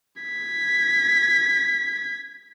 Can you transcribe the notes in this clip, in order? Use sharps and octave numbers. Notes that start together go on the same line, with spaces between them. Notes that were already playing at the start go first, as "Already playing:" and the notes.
G#6 B6